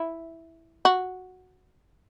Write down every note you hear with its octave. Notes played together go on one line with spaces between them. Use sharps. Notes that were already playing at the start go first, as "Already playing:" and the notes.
Already playing: E4
F#4